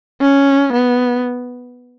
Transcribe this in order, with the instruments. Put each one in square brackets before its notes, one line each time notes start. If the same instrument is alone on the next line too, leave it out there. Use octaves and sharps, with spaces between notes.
[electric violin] C#4
B3